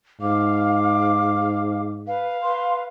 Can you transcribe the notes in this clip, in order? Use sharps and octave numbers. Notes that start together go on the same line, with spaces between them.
G#2 F5 D6
B4 F5
B4 C6